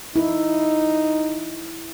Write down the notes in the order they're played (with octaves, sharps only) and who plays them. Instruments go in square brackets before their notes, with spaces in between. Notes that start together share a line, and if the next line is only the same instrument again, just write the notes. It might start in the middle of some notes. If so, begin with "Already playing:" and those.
[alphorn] D#4 [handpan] E4